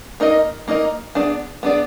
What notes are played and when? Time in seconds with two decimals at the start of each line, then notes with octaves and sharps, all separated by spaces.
0.20 A#3 D#4 A#4 D#5
0.68 A#3 D#4 A#4 D#5
1.15 B3 D4 G#4 D5
1.63 B3 D4 G#4 D5